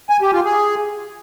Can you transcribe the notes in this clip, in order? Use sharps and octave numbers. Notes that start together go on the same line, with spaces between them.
G#5
G4
F4
G#4